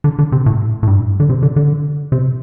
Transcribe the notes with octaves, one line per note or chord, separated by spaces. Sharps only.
D3
D3
C3
A2
A2
G2
D3
C3
D3
D3
C3